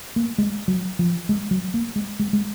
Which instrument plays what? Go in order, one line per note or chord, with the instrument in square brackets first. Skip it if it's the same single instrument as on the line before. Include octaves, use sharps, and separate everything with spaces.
[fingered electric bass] A#3
G#3
F#3
F3
G#3
F#3
A#3
G#3
G#3
G#3